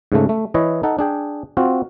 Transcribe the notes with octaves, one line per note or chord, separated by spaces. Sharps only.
G#2 C#3 A3
A3
E3 E4 B4 C#5 D#5
D#4 A4 F#5
D4 G#4 G5
C4 F4 F#4